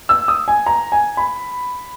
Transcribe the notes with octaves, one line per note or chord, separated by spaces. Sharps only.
E6
D#6
G#5
A#5
G#5
B5